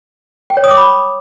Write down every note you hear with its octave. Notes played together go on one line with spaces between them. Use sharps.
G5
C#5
D#6
D6
B5